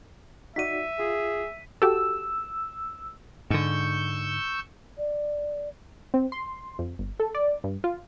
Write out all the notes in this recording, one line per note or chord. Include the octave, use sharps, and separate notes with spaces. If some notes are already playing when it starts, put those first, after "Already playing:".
D#4 F#4 D5 E5 B6 D#7
F4 G#4
F#4 G4 A4 E6
G#2 D3 C#6 E6 G6
D5
C4
C6
F2
G1
A4
D5
G2
F4